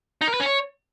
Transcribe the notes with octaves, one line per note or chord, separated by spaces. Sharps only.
D#4
A#4
B4
C#4
C#5